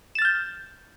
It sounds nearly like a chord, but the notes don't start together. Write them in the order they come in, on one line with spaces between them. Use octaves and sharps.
E7 A6 F6 G6